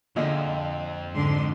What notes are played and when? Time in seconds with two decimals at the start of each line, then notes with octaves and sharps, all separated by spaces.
0.16 F2 A#2 D3 G#4 D#5 F5
1.13 G#2 D3 C6